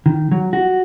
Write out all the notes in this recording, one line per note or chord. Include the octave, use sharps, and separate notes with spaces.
D#3
F#3
F#4